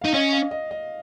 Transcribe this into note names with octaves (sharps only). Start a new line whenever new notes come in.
D#4 F5
C#4 D#5
F5
D#5
D#5